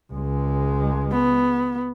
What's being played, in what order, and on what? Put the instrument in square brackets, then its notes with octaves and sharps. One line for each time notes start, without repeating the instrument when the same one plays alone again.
[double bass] C#2 G#3
[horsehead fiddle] B3